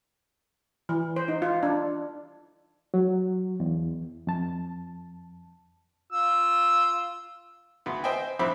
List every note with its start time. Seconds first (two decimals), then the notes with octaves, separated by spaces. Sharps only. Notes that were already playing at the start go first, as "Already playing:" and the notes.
0.89 E3
1.16 C5
1.28 D#4
1.42 F4
1.63 D4
2.94 F#3
3.60 E2
4.27 F2 A5
6.13 F4 E6
7.86 D2 B3
8.04 C5 D#5 E5 G5 G#5
8.39 A#1 C4 E5 B5 D6